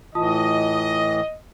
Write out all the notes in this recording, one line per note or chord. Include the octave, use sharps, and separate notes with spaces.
A2 E3 F4 D#5 A5 D#6